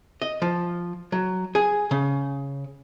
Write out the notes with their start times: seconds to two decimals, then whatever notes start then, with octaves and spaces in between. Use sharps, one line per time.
0.22 D#5
0.42 F3
1.12 F#3
1.55 G#4
1.91 C#3